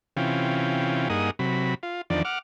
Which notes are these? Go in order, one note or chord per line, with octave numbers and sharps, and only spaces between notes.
C3 E3 C#4 F4 G5
G2 A#3 D#4 G#4 F#5 D#6
C3 F#3 B5
F4
E2 D#3 F3 D4 D5
F#5 D6 F6